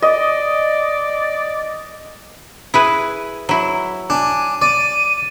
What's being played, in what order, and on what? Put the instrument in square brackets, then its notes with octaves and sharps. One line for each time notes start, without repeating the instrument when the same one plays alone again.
[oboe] D5 [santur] D#5
[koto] E4 G#4 B4
F#3 E4
[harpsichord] D4 [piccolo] G#5
[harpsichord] D5 [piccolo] D#7